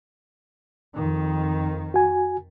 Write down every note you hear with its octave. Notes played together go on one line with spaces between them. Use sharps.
F2 D#3
F#4 G#5